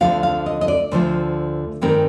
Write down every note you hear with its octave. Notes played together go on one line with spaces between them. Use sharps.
D2 D3 F3 F5
F5
D#5
D#5
D5
D2 D3 F3 C5
G2 D#3 G#3 C4 A#4